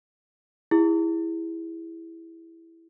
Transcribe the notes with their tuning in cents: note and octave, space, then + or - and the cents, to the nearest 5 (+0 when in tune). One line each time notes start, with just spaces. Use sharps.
E4 +0 G#4 -25